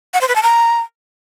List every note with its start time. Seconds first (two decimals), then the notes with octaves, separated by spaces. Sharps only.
0.14 F#5
0.21 C5
0.28 B4
0.36 A5
0.43 A#5